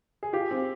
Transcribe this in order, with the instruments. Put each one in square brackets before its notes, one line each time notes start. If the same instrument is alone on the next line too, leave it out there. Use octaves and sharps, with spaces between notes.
[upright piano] G#4
[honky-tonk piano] F4 [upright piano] G4
[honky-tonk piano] C4